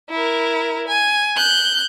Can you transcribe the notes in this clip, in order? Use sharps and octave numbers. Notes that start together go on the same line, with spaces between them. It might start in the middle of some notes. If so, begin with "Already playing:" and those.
E4 A#4
G#5
F#6 G6